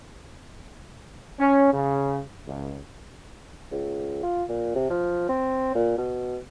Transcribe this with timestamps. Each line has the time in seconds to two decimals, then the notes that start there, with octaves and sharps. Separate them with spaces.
1.40 C#4
1.73 C#3
2.47 C#2
3.71 C#2
4.23 F4
4.49 A#2
4.75 C3
4.90 F3
5.29 C4
5.75 A#2
5.98 B2